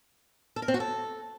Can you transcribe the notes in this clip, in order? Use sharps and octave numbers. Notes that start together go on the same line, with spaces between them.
A4
A#4
C4
F#4
A4